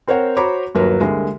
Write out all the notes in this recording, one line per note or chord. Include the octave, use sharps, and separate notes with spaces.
C4 A#4 C5 C#5 F#5 G5
F#4 C5 C#5 A#5 B5 D6
G1 D#2 F#3 A#4 B4
C2 D3 G#3 A#3